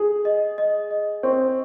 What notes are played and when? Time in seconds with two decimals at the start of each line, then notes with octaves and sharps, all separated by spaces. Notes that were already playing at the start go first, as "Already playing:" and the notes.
Already playing: G#4
0.25 D#5
0.58 D#5
0.91 D#5
1.23 C4 C#6